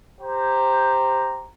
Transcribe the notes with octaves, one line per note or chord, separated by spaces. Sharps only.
G4 C5 A#5